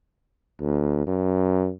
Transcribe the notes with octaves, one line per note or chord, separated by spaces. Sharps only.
D2
F#2